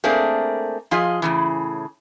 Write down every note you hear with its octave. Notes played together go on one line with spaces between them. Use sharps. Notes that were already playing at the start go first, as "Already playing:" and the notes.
A3 A#3 C4 D4 G#4 A#4
F3 F4 G#4 D#5
A2 C#3 E3